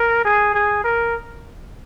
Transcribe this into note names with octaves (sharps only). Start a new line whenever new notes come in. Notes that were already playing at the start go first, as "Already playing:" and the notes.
Already playing: A#4
G#4
G#4
A#4